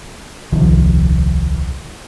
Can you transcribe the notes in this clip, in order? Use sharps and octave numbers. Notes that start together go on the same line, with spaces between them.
D#1 C2 D#3 F3